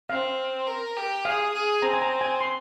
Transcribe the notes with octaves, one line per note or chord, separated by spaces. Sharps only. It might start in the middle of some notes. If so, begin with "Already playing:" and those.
C4 F5
A#4
G4
G#4 F5
G#4
C4 A#5
G#5
A#5
G#5
C6